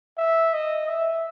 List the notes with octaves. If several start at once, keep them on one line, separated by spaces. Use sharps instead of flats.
E5
D#5
E5